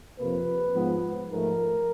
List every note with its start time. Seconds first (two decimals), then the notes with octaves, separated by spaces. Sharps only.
0.19 F2 C3 F3 A#3 B4
0.74 G#2 F3 G#3 B3
1.30 G#2 F3 A3 A#4